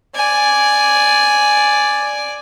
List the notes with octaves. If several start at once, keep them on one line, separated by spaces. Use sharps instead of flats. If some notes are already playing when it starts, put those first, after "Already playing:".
D5 G#5